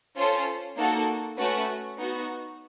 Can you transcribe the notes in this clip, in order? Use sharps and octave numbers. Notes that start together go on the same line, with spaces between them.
C#4 F4 A4 C5
A#3 D#4 F#4 A4
A3 C#4 F#4 B4
B3 D#4 F#4